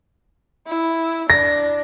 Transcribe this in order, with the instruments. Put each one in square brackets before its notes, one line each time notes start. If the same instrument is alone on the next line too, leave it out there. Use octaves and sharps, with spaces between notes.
[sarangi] E4
[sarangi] D4 [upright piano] A#6